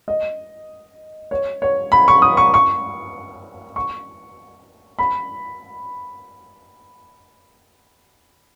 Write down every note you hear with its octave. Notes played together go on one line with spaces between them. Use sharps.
D#5
C#5
C#5
B5
C#6
D#6
C#6
C#6
C#6
B5